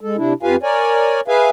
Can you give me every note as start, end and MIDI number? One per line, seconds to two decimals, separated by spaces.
0.01 0.17 56
0.01 0.17 69
0.17 0.33 48
0.17 0.33 62
0.17 0.33 64
0.43 0.56 41
0.43 0.56 65
0.43 0.56 67
0.43 0.56 71
0.43 0.56 77
0.43 0.56 80
0.63 1.21 70
0.63 1.21 73
0.63 1.21 74
0.63 1.21 80
1.28 1.50 68
1.28 1.50 71
1.28 1.50 76
1.28 1.50 77
1.28 1.50 80